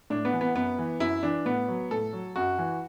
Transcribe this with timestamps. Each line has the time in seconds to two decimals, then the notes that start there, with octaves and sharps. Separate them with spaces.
0.10 A2 D4
0.25 B3
0.33 E3
0.41 B3
0.55 F#2 B3
0.79 E3
1.00 F#2 E4
1.23 E3 D4
1.45 A2 B3
1.68 F#3
1.91 A2 A4
2.13 F#3
2.36 F#2 F#4
2.59 E3